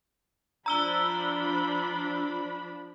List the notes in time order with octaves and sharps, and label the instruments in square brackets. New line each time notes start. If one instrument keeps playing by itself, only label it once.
[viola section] F3 D4 B5 [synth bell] A#5 E6 G7